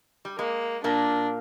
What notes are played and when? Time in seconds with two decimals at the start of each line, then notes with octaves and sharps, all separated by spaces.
0.25 G3
0.38 G#3 A#3
0.84 A#2 A#3 D4